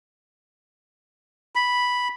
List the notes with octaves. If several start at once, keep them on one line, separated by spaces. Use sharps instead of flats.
B5